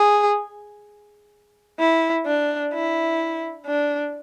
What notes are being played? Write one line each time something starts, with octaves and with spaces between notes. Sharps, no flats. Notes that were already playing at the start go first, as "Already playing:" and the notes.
Already playing: G#4
E4
D4
E4
D4